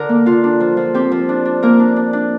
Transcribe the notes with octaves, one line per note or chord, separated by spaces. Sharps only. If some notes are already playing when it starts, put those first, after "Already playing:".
Already playing: D3 A#4
A#3
D3 F4
D4
F3
F3
C4 G4
F3
D4
D4
A#3 A#4
D4
D4
D4